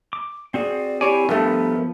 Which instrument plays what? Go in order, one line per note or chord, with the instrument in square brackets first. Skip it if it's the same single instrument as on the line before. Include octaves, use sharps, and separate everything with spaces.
[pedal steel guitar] D6
[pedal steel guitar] C4 F#4 G#4 [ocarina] D5
[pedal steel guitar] C4 E4 G#5 [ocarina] G4 [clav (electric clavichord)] C#5 D5
[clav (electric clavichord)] G2 A3 [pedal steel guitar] F3 B3 [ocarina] A#4